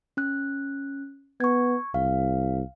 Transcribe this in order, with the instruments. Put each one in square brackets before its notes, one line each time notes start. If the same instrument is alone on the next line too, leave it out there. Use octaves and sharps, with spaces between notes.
[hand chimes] C#4 F#6
[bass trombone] B3 [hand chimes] C#6 G#6
[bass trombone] C2 [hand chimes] F5